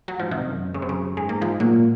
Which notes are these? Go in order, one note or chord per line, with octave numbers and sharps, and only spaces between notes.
F#3
G#2 F3
C3 D#3
F#2
F#2 C#3
C3
C#3
G#2 G#3
A#3
F3 G#3
A#2 F#3 A#3